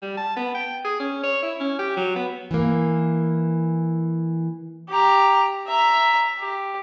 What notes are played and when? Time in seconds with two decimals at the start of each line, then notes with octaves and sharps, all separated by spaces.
0.02 G3
0.17 A5
0.36 B3
0.55 G5
0.85 G#4
1.00 C#4
1.23 C#5
1.43 E4
1.60 C#4
1.79 G4
1.97 F#3
2.16 B3
2.51 E3 A#3
4.89 G4 A#5
5.67 E5 A#5
6.39 G4